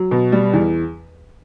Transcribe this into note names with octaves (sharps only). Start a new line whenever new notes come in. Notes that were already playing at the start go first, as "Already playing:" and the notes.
Already playing: F#3
B2
G3
E2